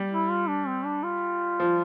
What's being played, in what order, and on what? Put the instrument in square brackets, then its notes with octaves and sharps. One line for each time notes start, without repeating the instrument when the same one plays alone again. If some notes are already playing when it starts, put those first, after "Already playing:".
Already playing: [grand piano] G3
[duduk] E4
F4
D4
C4
D4
F4
[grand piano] F3